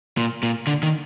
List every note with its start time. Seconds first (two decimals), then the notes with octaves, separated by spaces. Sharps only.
0.17 A#2
0.43 A#2
0.67 D3
0.83 D#3